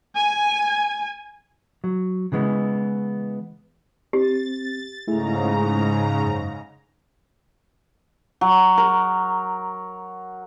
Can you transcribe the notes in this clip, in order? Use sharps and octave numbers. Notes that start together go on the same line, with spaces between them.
G#5
F#3
C#3 E3 G#3 B3
C4 G4 A6
G#2 C#3 A3 E4 G#4 A#5
F#2
F#3
A#4